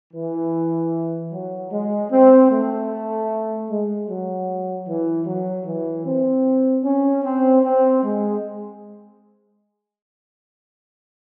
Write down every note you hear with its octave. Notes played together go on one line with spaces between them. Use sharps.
E3
F#3
G#3
C4
A3
G#3
F#3
E3
F#3
E3
C4
C#4
C4
C4
G#3